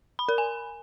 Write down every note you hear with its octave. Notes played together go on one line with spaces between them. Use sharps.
B5
A#4
G#5